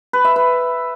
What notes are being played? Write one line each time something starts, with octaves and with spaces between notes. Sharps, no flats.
B4
E5
B4